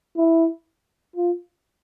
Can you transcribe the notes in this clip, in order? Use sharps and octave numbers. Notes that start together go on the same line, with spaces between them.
E4
F4